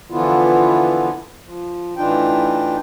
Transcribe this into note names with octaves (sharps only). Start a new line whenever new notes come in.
D3 E3 F3 B3 E4 F4
F3
A2 E3 D4 D#4 F4 G5